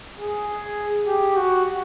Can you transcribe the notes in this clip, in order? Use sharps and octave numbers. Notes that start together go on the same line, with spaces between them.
G#4
G4
F#4